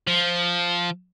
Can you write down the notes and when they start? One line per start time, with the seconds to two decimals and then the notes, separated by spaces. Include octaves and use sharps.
0.07 F3